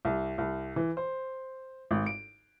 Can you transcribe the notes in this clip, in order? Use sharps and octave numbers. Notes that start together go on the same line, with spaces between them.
C2
C2
E3
C5
G#1
D7